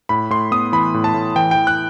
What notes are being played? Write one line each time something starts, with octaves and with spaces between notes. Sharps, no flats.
A2 B5
A2 C6
B3 D#6
E3 B5
A2
A5
A2
E3 G5
E3 G5
F#6